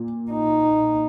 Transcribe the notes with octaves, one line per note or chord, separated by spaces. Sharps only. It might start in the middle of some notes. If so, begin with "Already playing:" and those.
Already playing: A#2
D#4